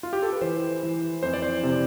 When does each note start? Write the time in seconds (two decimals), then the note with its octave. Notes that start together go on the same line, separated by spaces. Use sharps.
0.03 F4
0.13 G4
0.23 A4
0.33 B4
0.41 E3 C5
0.83 E3
1.23 F2 C5
1.34 D5
1.42 C5
1.63 C3